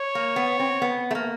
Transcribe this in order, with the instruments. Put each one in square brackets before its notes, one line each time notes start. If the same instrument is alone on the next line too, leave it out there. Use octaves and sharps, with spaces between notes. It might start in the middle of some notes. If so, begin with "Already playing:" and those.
Already playing: [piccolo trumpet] C#5
[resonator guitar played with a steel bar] A#3
B3
C4
B3
A3
A#3